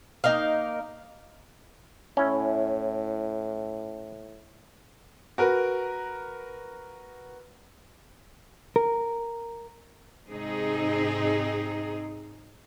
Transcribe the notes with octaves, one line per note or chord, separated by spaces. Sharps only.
A#3 D#4 A#4 F5
A2 C#4 E4
F#4 A#4 B4
A#4
G#2 C3 C4 D#4 G#4